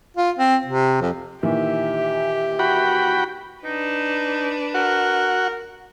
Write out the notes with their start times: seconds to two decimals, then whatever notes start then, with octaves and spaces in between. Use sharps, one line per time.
0.17 F4
0.38 C4
0.66 C3
1.01 F2
1.43 A#2 D#3 E3 G4 E5
2.59 F#4 G5 B5
3.64 D4 D#4 B4
4.74 F#4 A#4 F#5